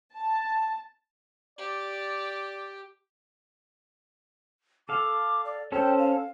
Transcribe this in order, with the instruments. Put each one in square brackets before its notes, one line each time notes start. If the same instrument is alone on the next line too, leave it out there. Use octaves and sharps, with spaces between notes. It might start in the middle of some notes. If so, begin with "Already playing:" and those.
[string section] A5
[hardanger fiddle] G4 [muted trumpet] D5
[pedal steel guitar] A4 F5 [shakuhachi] D6
[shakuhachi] D5
[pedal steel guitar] C#4 A4 C5 [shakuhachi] G5
[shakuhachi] F5